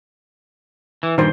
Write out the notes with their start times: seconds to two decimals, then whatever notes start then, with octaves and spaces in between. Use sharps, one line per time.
1.03 E3
1.18 G2 A#2 D#3 C5